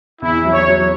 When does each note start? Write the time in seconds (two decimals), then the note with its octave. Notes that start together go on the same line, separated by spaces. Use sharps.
0.22 E2 E4
0.45 F#3
0.53 C#5
0.68 F#3